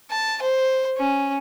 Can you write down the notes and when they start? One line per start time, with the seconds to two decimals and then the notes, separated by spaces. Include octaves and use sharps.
0.11 A5
0.42 C5
0.97 C#4